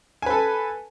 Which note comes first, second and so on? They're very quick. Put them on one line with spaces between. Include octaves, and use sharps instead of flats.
G#5 B4 A4